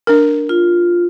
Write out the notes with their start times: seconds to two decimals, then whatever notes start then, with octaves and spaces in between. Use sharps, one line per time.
0.07 D4 A#4
0.49 F4